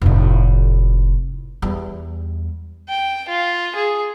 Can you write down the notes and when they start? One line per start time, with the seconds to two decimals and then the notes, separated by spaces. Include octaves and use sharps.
0.02 F1 A2
1.62 E2 G3
2.89 G5
3.29 F4
3.75 G#4